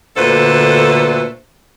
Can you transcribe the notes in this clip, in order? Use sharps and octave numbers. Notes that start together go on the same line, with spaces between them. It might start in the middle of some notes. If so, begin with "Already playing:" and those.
D2 A#2 D3 A4 B4 C5